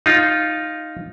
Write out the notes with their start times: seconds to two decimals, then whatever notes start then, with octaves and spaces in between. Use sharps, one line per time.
0.06 D#4 F4